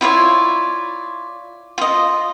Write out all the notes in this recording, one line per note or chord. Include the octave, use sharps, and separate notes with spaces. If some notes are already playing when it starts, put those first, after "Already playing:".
E4 F4 C#5 D5
F4 D#5